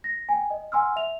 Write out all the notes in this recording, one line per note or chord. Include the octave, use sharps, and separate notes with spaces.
A#6
G5 G#5
D#5
F#5 G#5 C6 E6 F6
E5 F7